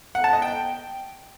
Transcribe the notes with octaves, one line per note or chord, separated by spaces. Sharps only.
F#5
A5
D#5
G5